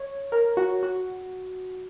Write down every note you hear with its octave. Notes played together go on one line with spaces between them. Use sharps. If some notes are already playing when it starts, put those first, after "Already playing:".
Already playing: C#5
A#4
F#4
F#4